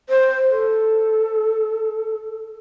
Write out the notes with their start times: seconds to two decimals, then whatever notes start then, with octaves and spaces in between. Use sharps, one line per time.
0.09 C5
0.49 A4